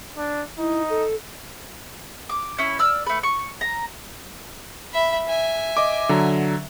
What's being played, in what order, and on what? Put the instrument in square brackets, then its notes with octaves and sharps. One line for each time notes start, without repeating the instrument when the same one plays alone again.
[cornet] D4
[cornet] D#4 [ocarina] E4
[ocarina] A4
[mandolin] D6
C#4 E4
D5 E6 F6
A3 B4
C#6
A#5
[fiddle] E5 B5
E5 G#5
[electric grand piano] D#5 D6
D3 F#3 A#5